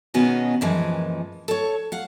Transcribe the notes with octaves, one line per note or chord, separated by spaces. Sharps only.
B2 D#3 B3 C#4 F#4 G#4
F#2 A#2 E3 F3 G#3
A4 C#5
F5 F#5